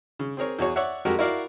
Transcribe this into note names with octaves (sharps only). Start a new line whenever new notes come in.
C#3
C4 G#4 A#4 C#5
E2 F#4 G#4 C#5
C#5 D5 E5 F#5
F2 G#3 F#4 G4 A#4
E4 F#4 A#4 D5 F5